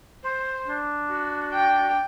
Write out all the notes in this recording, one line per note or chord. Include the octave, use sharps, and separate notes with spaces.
C5
D4
F#4
G5